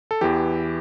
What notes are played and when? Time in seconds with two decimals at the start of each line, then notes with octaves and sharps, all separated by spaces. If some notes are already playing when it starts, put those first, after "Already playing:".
0.11 A4
0.21 E2 E3 G4